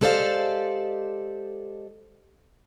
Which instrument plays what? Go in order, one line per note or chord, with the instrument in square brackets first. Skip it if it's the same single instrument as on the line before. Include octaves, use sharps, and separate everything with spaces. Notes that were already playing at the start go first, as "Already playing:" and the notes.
[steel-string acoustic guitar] G#3 G4 A4 C5 D5 F5